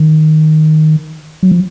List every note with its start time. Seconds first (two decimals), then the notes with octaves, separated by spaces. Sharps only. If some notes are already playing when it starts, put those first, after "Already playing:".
Already playing: D#3
1.43 F#3
1.51 F3